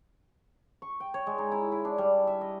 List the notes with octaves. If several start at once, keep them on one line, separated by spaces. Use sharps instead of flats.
C#6
G5
C#5
G#3
D#4
E4
E4
D4
G3
E5
D#5